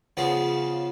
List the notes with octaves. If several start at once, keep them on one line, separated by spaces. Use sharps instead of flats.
C#3 F3 B3 G#4